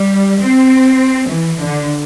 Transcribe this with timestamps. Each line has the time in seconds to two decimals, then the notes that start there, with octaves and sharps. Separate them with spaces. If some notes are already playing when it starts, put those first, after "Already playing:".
Already playing: G3
0.40 C4
1.29 E3
1.60 D3